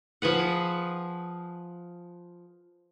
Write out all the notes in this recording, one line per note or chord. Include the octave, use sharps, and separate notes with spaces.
F3 G#4 B4 F#5